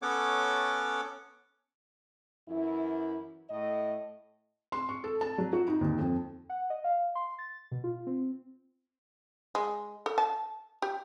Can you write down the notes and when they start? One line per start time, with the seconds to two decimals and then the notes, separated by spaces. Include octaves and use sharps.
0.02 B3 C#4 A4 C#5 F#5 D6
2.49 F#2 E3 E4
3.50 A2 A3 D#5
4.72 C6
4.89 C#6
5.04 A4
5.21 A5
5.38 F#3
5.53 F#4
5.68 D#4
5.81 D#2
5.98 F2
6.49 F#5
6.70 D#5
6.84 F5
7.15 C6
7.39 A6
7.71 B2
7.84 F4
8.07 C4
9.55 G#3
10.06 A4
10.18 A5
10.82 G4